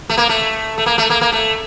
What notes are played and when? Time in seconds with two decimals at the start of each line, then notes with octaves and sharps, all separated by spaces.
0.10 A3
0.18 A#3
0.29 A3
0.78 A3
0.86 A#3
0.98 A3
1.10 A#3
1.21 A#3
1.32 A3